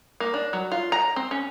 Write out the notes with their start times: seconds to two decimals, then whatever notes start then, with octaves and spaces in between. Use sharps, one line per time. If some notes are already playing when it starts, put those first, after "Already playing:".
0.20 A#3
0.34 D4
0.53 F#3
0.72 F4
0.92 A#5
1.16 C4
1.31 C#4